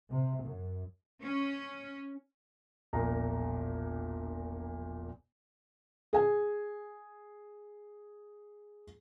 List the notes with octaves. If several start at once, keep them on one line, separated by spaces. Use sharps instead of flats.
C3
F#2
C#4
E1 A#1 A#2 A#5
G#4 G#5